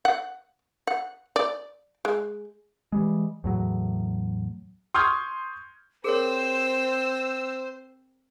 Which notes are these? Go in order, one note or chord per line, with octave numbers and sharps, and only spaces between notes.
F#5
F#5
D5
G#3
E3 G3 G#3
E2 A2 F#3
C6 C#6 D#6 F6 G6 G#6
C4 G#4 A#4 C5 C#5 E6